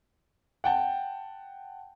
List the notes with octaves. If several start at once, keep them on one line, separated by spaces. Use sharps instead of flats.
F#5 G5 A5